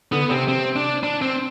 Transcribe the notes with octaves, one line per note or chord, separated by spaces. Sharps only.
D3 B3
C3 C4
C4
D4
D4
C4